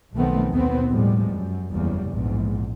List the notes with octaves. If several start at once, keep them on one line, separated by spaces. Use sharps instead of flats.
B1 D#3 F3 A3 B3 C4
D#2 B2 B3 C4
A2 F3 G3 G#3
F#2
F#1 E2 C#3 G3
A#1 E2 G#2